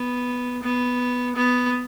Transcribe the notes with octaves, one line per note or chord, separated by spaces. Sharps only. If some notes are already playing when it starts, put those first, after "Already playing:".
Already playing: B3
B3
B3